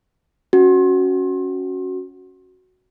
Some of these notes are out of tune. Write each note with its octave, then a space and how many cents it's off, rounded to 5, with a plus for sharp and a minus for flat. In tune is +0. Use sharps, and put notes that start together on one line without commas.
C#4 +0 F#4 +0